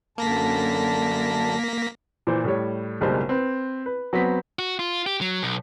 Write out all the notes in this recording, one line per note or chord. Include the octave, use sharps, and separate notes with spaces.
F#2 D3 A#3 A5 A#6 B6
A#2 E3 C5
A2 G3 C#5
F#1 B1 G3 G#3 A#4 C5
C4 B4
B4
F#3 B3 C4 B6
F#4
F4
G4
F#3
B1